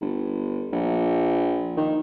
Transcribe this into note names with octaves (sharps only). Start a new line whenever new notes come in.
G1
A#1
D#3